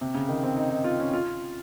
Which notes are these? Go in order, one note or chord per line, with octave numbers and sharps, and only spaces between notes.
C3
C#3
D#3
C4
D#4
D#4
F4
C#4
F4